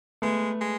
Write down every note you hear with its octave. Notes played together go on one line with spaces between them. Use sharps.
G#3 A3 B3
G#3